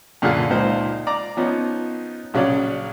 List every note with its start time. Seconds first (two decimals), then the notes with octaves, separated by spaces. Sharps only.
0.22 F#2 A#2 D3 G#4 F5 F#5
0.50 C#2 A#2 F3 D#4 C5
1.07 D5 A#5 D6
1.37 F3 B3 C#4 D#4
2.34 A#1 C#3 F#3 C#4 D5